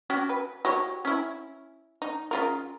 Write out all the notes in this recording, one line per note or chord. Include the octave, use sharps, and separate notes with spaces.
C#4 F#4 G4
B4
F#4 G4 C#5
C#4 E4
D#4
C#3 F4 A#4